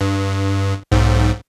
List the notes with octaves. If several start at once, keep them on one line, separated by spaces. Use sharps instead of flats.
G2
B1 G#2